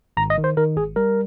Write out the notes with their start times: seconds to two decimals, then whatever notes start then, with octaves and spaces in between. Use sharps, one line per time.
0.17 G#1 A#5
0.30 D#5
0.38 D#3
0.44 C5
0.57 D#3 A#4
0.76 G#1 G#4
0.96 G3 A#4